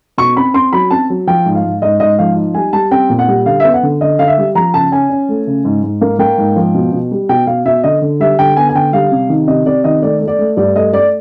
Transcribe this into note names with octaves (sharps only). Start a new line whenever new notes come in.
B2 C#6
C4 B5
C4 C6
F#3 B5
C4 A5
F#3
F3 G5
G#2
F5
G#2
G#2 D#5
G#2 D#5
F3 F5
D#4
G3 G#5
G3 A5
C4 G5
A#2
F#5
G3
D3 F5
E5
B3
F#5
D3
D3 D#5
D3 F5
E5
G3
F3 A#5
C#3 A5
C#4 G#5
C#4
A3
C#3
G#2
G#2
A#3
A#3 G5
G#2
F3
B2
B2
G3
B2 G5
B2 F5
B2 E5
D3 D#5
D3
G3 E5
D3 G5
B3 G#5
G#5
D3 G5
G3 F5
C3
D#3
C3 D#5
C3 D5
D#3 D#5
A3 D5
A3
D5
A3
G2 D5
A3 D#5
A3 D5